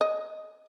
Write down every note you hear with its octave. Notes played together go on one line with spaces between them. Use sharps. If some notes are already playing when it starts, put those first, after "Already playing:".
D#5